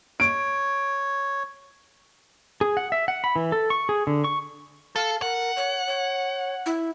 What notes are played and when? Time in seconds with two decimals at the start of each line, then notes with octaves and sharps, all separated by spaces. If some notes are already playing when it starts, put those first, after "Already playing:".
0.20 C#5 D7
2.61 G#4
2.77 F#5
2.92 E5
3.08 F#5
3.24 B5
3.36 E3
3.52 A4
3.70 C#6
3.89 G#4
4.07 D3
4.24 C#6
4.96 A4 F5
5.22 A#4 F#5
5.57 C#5
5.87 C#5
6.66 E4